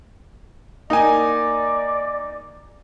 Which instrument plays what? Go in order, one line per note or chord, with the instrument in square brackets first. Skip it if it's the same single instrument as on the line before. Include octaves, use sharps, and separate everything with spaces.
[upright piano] A#3 G#5 [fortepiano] D#4 [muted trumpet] D5